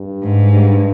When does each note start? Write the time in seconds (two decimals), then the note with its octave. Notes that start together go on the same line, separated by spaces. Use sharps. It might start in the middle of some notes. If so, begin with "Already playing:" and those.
Already playing: G2
0.22 G#2
0.54 G2